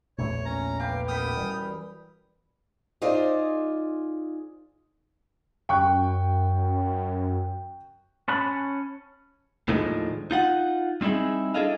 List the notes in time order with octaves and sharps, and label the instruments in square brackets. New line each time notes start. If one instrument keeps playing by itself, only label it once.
[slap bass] A#1 E2 A3 [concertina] C#5
[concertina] C#4 A#5
[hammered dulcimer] G4 B4 [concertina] F5
[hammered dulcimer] F#2 B5 [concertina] G5 D#6 F6
[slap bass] E3 G3
[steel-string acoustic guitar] D#4 F4 G#4 C5 D5
[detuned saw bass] F#2 [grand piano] G5 C#6 F#6
[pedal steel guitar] C#4 A5 B5 F#6
[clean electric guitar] D#2 A2 D3 D#3 F3 G#3
D#4 F4 F#5
G3 C4 D#4 E4 G#4
D4 E4 G#4 A4 D#5 F5